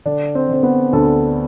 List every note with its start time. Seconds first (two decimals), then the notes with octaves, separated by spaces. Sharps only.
0.06 D3 D4
0.35 C4
0.49 D3 C4
0.63 B3
0.93 D2 A4